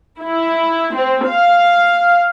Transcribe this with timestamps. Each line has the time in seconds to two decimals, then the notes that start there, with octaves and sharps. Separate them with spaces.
0.19 E4
0.96 C4
1.26 F5